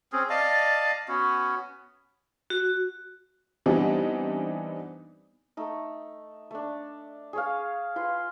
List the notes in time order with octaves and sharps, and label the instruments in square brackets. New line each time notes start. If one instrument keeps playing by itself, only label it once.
[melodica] C4 C#4 G#4
D5 D#5 F5 A5
B3 C#4 F#4
[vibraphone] F#4
[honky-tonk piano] E3 G3 B3 C4 D4 D#4
[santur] A3 D#4
A3 D4
G#4 C#5 F5
F4 B4 C6